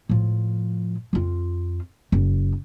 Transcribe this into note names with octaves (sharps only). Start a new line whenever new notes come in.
A2 F3
F2 F4
F#1